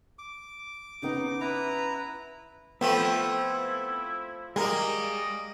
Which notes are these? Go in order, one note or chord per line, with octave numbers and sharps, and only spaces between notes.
D6
C#3 B3 D#4
E4 B4 A#5
F3 A3 B3 C4 E4 E5 G5 B5
G3 G#3 A#3 A#4 D#5 G#5